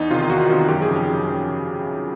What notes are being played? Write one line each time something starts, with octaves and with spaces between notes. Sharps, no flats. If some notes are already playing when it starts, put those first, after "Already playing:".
Already playing: E2 D#4
C3 D#3 F4
E2 F#4
C3 D#3
F#2 G4
G#4
C#3 F3
G4
F#2
C#3 F3